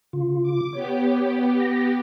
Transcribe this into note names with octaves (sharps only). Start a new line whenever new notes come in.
C#3 F4
D6
B3 G4 C#5
A#6